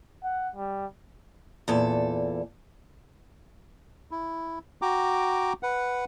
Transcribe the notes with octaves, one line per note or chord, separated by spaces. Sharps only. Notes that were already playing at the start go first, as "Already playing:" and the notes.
F#5
G3
E2 A#2 A4
E4
F#4 G5 A#5 D6
B4 F#5